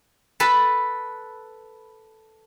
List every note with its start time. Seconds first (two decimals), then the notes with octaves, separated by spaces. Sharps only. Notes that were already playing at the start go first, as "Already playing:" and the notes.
0.40 A4 B4 A5 B5